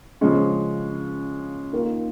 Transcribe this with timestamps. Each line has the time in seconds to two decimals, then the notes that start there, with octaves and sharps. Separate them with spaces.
0.21 C#3 F3 G#3 C#4
1.73 D#3 A#3 F4